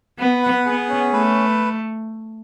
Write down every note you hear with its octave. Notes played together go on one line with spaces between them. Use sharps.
B3 B4
F#5
B3 G#4
C#4
A3 B4